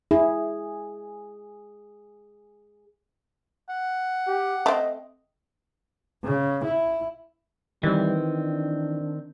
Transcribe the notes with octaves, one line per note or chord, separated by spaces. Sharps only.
E4 G#4
F#5
G4
A3 C4 D#5
C#3
E4
D#3 E3 G3 C4
D4